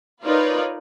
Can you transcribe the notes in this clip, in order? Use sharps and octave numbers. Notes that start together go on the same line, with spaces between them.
D#4 F4 A#4 B4 C#5 D5